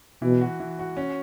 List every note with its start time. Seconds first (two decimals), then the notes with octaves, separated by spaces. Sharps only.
0.22 B2 E3
0.41 F#4
0.60 E3
0.79 F#4
0.97 C#4